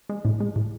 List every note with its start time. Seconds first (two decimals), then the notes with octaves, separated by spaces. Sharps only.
0.09 G#3
0.25 A2
0.40 G#3
0.56 A2